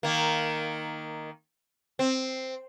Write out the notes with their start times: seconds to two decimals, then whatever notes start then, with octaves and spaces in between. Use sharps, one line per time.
0.03 D#3 A#3
1.99 C4